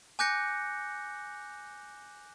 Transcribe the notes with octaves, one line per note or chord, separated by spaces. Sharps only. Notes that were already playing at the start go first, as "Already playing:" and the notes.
G#5 D6 F#6 G6 A#6 C#7